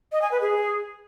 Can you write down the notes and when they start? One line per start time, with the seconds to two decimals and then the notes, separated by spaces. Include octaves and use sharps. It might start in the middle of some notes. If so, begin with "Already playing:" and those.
0.12 D#5
0.22 G#5
0.31 B4
0.41 G#4